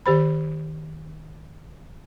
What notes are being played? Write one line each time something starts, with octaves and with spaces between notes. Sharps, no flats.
D#3 G4 C5 B5